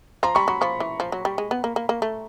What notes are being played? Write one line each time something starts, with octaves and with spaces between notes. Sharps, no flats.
F3 A#5 C6
G3 B5 C#6
F#3 B5 C#6
F3 B5 C#6
E3
F3
F#3
G3
G#3
B3
A#3
A#3
A#3
A3